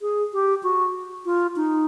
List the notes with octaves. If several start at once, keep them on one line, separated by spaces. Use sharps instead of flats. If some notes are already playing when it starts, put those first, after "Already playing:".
G#4
G4
F#4
F4
D#4